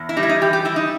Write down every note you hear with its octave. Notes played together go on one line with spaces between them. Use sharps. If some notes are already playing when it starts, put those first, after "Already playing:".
Already playing: E2
E4
G3 D#4
E4
D#4
E3 G4
G4
G3 E4
D#4